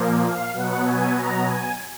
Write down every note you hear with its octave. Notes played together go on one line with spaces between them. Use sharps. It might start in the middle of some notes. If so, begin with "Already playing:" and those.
Already playing: A#2 F3 A#3
F5
B2 F#3 B3 F#5
G#5
A#5
G#5